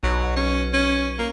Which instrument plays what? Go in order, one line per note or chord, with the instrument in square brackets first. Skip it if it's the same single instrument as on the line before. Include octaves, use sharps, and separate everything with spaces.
[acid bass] B1 [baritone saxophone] F#3
[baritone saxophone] C#4
C#4
A#3